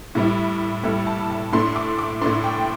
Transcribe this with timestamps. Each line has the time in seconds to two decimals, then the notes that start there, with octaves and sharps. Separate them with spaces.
0.15 A2 G3 E4
0.83 A2 G3 E4 A4
1.07 A5
1.30 A5
1.53 A2 A3 D4 C6
1.76 D6
1.99 D6
2.21 A2 A3 D4 C6
2.44 G5